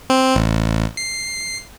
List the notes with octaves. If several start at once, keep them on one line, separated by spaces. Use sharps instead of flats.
C4
A1
C7